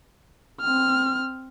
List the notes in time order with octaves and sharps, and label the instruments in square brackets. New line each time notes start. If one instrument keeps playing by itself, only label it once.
[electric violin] C4 F6